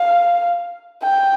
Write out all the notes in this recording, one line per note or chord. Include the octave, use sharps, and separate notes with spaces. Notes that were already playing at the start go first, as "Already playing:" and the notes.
Already playing: F5
G5